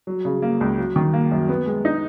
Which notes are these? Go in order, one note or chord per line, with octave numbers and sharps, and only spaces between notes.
F#3
C#3
A#3
C#2
F#3
D#3
A#3
F#2
B3
G#3
D#4